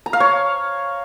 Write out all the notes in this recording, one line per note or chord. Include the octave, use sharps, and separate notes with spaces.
A#5
F5
C#5